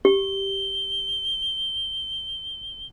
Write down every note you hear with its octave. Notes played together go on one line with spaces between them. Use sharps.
G4 G7